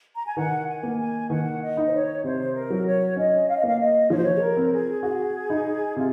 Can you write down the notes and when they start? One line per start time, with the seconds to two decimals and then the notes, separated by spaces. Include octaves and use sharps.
0.14 A#5
0.26 G#5
0.37 D#3 F#5
0.68 G#5
0.83 A#3
1.00 G#5
1.30 D#3 F#5
1.62 D#5
1.77 D#4
1.87 C5
1.92 C#5
2.24 C3 C5
2.54 A#4
2.70 F#3
2.86 C#5
3.16 C#4 D#5
3.48 F5
3.57 D#5
3.63 A#3 F5
3.79 D#5
4.10 F3 C#5
4.18 C5
4.24 C#5
4.36 G#4
4.41 A#4
4.57 C4
4.72 G#4
5.03 F#4 G#4
5.50 D#4
5.96 C3 F4